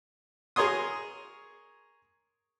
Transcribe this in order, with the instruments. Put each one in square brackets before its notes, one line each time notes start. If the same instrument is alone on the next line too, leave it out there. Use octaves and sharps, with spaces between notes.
[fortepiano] G#4 A#4 C#5 C6 D#6